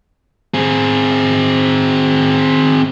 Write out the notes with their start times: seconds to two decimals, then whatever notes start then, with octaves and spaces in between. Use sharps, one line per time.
0.54 C4 G#4